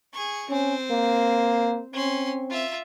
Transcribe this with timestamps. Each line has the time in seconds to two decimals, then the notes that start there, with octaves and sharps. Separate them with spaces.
0.13 G#4 C#6
0.49 C4 C#4 C5
0.91 A#3
1.93 C4 C#4 C6
2.50 F4 E5